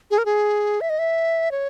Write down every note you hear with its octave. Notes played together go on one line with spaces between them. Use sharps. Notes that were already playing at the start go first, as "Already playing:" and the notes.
G#4
A#4
G#4
E5
D#5
E5
C#5